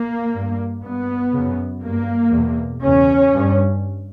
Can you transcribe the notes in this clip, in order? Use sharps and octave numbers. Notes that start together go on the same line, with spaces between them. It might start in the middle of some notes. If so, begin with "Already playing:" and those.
Already playing: A#3
G2
G2 B3
F#2 C#3
G2 A#3
E2 B2
E2 C#3 C#4
G2